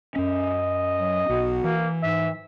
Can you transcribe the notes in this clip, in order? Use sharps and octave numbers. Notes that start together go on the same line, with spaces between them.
F#2 C#4 D#5
F#3
B1 F#4
E3 A#3
G#2 E5